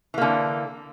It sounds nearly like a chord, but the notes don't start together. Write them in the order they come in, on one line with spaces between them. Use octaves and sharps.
E3 A#3 D3